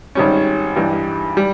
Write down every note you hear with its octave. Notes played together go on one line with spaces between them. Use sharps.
G#1 G#2 G3 C#4
G2 E3 G3
G3